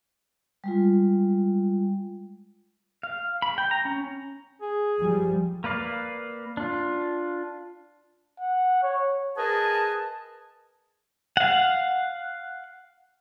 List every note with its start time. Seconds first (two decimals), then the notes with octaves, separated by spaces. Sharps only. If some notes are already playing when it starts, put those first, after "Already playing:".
0.64 G3 G#3 F4
3.03 F5
3.42 B5
3.58 G5
3.71 A#5
3.85 C#4
4.62 G#4
5.00 F3 G3
5.64 A#3 B4 D5 F5
6.57 D4 F4
8.41 F#5
8.83 C#5
9.37 G#4 A#4 B4 D#5 G#5 A5
11.37 F5 F#5